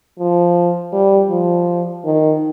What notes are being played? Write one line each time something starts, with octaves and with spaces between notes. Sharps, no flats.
F3
G3
F3
D#3